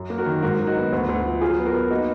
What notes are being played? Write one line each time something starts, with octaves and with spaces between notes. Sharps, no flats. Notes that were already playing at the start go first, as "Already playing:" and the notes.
Already playing: F#2
A#3
F#4 A#4
D#3
G#2 F#4 A#4
F#3
D#4 F#4
B3
D2
D2
F3
F#3 F4 G#4
B3
F#4 A#4
B3
A#3 D#4 F#4